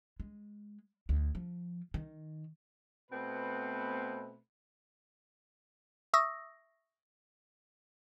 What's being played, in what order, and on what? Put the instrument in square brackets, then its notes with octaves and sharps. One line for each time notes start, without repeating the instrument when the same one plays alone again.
[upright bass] G#3
D2
F3
D#3
[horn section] B2 A3 B3 C4 B4 C5
[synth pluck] E5 C#6 D#6 E6 A#6